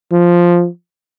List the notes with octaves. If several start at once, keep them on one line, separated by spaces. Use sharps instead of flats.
F3